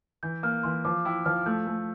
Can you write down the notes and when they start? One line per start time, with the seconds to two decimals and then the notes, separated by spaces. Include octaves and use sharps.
0.23 E3 G6
0.43 A#3 F6
0.63 E3 C6
0.85 F3 D6
1.05 E4 G5
1.25 F3 F6
1.46 A3 G6
1.67 A3